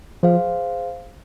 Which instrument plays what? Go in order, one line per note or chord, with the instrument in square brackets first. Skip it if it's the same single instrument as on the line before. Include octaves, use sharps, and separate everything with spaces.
[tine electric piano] F3 [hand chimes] G#4 C5 F5